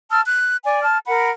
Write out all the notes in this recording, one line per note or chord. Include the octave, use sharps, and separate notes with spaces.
A5 E6 F6
F#6
D5 G#5
A5 F6
A#4 F#5 B5